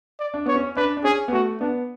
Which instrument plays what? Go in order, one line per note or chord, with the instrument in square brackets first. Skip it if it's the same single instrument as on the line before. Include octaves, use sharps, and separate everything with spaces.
[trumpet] D5
[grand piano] D4
[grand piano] B3 [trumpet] C#5
[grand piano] C#4
[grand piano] D4 [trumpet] B4
[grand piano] D4
[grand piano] C#4 [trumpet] G#4
[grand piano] B3
[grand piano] A3 [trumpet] F#4
[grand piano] B3 [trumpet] D4